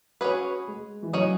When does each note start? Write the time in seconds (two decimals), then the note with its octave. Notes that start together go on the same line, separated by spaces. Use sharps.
0.21 C#4 F#4 G#4 B4
0.68 G#3
1.02 E3
1.13 F#3 C#4 G#4 D#5